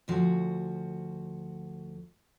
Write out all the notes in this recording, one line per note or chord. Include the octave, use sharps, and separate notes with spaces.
D2 F3 F#4